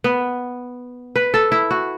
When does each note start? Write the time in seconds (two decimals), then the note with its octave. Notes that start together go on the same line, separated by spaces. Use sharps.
0.04 B3
1.16 B4
1.34 A4
1.52 E4
1.71 F#4